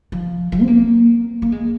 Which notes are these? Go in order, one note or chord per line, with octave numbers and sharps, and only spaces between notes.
F3
F3
C4
A#3
A#3
G#3